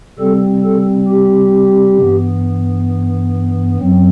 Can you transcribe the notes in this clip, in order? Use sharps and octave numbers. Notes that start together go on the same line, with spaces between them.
C3 G3 C4 A4
A4
G4
G2 E3 B3
F#2 F#3 C4